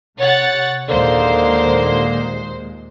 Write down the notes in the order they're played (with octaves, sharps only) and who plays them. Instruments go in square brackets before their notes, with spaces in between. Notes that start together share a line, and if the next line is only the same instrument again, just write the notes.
[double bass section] C3 [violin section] C#5 F#5 A6
[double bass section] D#2 A#2 G#3 [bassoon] D3 [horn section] A#3 [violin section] C5